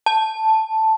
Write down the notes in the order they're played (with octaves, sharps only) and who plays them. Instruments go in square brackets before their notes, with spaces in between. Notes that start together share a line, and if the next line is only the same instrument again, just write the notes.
[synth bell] A5